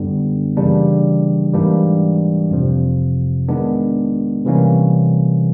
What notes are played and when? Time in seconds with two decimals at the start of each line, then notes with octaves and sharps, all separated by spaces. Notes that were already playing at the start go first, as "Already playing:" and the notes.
Already playing: F#2 D3 G3 B3 D4
0.57 C#3 E3 G3 A#3 D4
1.53 G#2 E3 G3 A#3 D4
2.51 F2 C3 F3
3.49 D#3 G#3 B3 D4
4.45 C3 E3 G3 A#3 C#4